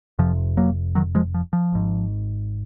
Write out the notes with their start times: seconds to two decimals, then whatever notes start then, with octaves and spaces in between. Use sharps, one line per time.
0.19 F1 F2 C3 F3
0.57 F#3 A#3
0.95 D#3 F#3
1.15 F3 G#3
1.34 F3
1.53 F3
1.72 G#1 G#2